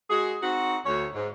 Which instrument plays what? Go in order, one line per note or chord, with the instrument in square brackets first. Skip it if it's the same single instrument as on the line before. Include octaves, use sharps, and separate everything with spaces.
[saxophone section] G#3 F#4 G#4
C4 D#4 F#4
D2 C#5
G#2